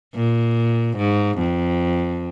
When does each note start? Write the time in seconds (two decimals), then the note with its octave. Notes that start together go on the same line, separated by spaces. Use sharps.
0.15 A#2
0.98 G#2
1.39 F2